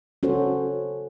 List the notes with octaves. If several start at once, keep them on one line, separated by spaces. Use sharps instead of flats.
C#4 F#4 A4 C5